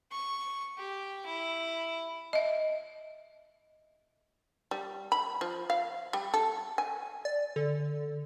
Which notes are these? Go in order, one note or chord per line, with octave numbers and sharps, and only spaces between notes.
C#6
G4
E4
D#5 E5
G3
B5
F3
F5
G3
A4
G#5
D5
D3